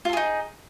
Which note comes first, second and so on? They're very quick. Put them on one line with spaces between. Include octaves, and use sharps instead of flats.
F4 A4 G#4 D#4